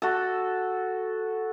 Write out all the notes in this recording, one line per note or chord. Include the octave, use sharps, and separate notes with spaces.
F#4 A4